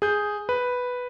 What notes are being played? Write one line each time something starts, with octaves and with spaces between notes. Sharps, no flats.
G#4 G6
B4